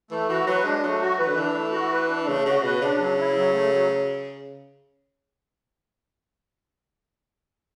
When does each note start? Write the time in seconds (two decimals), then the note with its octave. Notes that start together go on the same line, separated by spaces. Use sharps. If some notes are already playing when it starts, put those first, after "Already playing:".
0.11 E3 A3
0.29 E3 F#4
0.47 F#3 B4
0.65 G#3 D4
0.83 F#3 A3
1.01 F#4
1.19 E3 B4
1.27 D3
1.35 E3 D4
1.55 A3
1.72 F#4
1.91 B4
2.09 D4
2.27 C#3 A3
2.45 C#3 F#4
2.63 B2 B4
2.81 C#3 D4
2.99 F#3
3.17 E4
3.35 F#3
3.53 A3
3.71 F#3